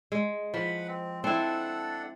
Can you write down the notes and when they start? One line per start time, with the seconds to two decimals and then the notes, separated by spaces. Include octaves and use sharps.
0.12 G#3
0.54 F3 B4 F#5 B5
0.88 C4
1.24 C4 D4 E4 A4 F#5